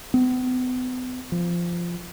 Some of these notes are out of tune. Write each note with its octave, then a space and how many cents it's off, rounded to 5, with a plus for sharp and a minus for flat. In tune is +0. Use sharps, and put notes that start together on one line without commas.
B3 +40
F3 -10